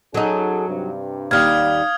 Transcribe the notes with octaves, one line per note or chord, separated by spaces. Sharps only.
F#3 C#4 D#4 G#4 A4
G2 C3
D#2 G3 F5 D#6 F6 G#6